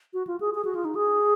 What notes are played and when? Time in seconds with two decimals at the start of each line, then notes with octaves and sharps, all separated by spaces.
0.14 F#4
0.27 F4
0.40 G#4
0.55 G#4
0.65 F#4
0.75 F4
0.85 D#4
0.95 G#4